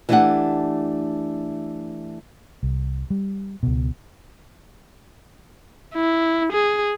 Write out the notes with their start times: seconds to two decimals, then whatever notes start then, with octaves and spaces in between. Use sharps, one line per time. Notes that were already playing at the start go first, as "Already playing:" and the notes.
0.09 E3 G3 A3 D4 G4 F#5
2.63 C2
3.10 G3
3.63 C#2 B2
5.94 E4
6.52 G#4